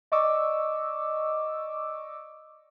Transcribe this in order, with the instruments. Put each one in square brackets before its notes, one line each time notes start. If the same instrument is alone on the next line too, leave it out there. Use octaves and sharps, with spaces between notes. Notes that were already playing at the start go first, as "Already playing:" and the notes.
[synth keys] D5 D#5 C#6 D6 E6